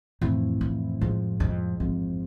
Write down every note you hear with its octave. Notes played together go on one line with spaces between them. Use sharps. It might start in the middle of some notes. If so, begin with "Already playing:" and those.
F2 A2 E3 A3 C4 E4
F2
F2 A2 F3 G#3
F2
A1 F2 G#2 F3 G#3 C4